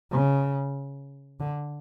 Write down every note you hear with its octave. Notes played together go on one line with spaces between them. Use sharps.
C#3
D3